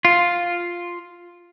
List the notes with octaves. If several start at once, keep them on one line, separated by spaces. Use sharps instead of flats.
F4